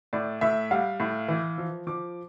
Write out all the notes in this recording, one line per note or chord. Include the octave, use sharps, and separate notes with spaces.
A2 D5
A2 E5
G3 F5
A2
E3
F3
F3 D6